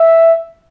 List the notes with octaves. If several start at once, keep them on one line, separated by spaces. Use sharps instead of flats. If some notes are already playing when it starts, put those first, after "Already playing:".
Already playing: E5